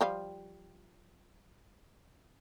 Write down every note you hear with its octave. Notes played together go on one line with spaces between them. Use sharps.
F3 G3 F5